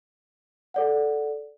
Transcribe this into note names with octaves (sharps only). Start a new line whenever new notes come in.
A4 D5 F#5